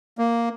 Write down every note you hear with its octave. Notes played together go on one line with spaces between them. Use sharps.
A#3